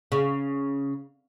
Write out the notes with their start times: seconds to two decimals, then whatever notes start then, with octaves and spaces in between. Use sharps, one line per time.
0.12 C#3